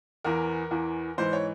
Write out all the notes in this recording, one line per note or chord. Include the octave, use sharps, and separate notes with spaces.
E2 E3 A#4
E2 E3
G#2 E3 C5
C#5